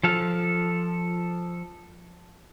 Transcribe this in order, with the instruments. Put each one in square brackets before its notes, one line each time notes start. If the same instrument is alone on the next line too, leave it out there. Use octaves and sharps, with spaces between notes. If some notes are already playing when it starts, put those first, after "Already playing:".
[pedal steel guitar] F3 A4 F5